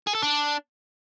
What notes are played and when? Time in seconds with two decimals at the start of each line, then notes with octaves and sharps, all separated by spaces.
0.07 G#4
0.15 A4
0.22 D4